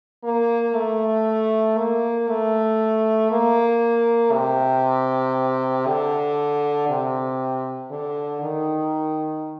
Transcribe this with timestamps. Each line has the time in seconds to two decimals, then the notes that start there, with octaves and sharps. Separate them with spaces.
0.24 A#3
0.74 A3
1.78 A#3
2.28 A3
3.31 A#3
4.33 C3
5.87 D3
6.89 C3
7.91 D3
8.42 D#3